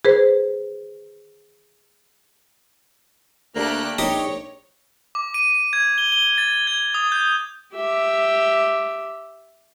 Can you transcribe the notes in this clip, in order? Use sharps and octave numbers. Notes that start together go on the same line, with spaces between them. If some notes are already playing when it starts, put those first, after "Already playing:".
G#4 B4 C5
D2 A3 A#3 G4 F#6
A#1 D#4 G4 C#5 A#5
D6
D#7
G#6
G7
G7
A6
G#6
D#6
G6
G4 E5